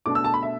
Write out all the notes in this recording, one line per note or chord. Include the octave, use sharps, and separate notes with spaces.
B2 A3 D4 D6
E6
A5
B5
E5